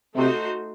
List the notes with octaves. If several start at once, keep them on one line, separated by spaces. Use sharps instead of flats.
C3 A3 D#4 F#4 C5